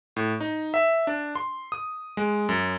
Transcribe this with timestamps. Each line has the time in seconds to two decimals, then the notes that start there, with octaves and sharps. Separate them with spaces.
0.16 A2
0.40 D#4
0.74 E5
1.07 D4
1.35 C6
1.72 D#6
2.17 G#3
2.49 F#2